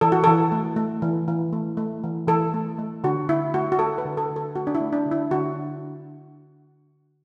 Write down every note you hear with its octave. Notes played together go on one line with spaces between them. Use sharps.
E3 A4
F#4
E3 A4
A3
A3
E3
E3
A3
A3
E3
E3 A4
A3
A3
D3 F#4
D3 E4
A3 F#4
F#4
A3 A4
B4
D3
A4
D3
A4
A3 F#4
D4
E4
A3
D4
D3
E4
D3 F#4